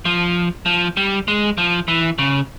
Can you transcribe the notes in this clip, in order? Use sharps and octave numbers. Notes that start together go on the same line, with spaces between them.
F3
F3
G3
G#3
F3
E3
C#3